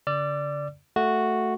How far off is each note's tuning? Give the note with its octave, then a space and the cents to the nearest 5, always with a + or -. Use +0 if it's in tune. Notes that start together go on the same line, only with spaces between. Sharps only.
D3 -45 D5 +0 E6 +45
A3 +0 F#4 -5